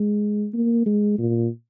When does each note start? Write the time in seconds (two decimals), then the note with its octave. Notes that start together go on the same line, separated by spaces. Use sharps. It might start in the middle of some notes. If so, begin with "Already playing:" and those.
Already playing: G#3
0.54 A#3
0.86 G#3
1.19 A#2